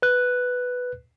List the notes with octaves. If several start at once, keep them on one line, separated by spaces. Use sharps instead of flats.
B4 F#6